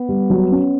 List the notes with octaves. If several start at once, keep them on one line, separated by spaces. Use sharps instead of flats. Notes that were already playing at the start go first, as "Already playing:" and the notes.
Already playing: B3
G3
F#3
C#4